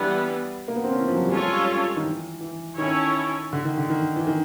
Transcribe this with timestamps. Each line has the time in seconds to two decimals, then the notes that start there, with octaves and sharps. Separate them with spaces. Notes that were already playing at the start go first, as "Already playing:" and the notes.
Already playing: E3 G3 B3 D4
0.68 A#3
0.76 B3
0.84 C4
0.92 C#4
1.00 E3
1.08 F3
1.14 F#3
1.22 G3
1.28 G#3 C#4 F4 A4 C#5
1.48 G3
1.97 D#3
2.03 E3
2.41 E3
2.78 D#3 C#4 E4 A4 C#5
3.53 D3
3.65 D#3
3.77 D3
3.90 D#3
4.16 E3
4.27 D#3